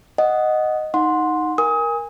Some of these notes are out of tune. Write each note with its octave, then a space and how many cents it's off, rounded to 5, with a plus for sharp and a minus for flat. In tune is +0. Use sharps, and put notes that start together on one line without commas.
D#5 +0 F#5 +0
D#4 +0 F#5 -25 C6 +0
A#4 +10 G#5 -20 D#6 +30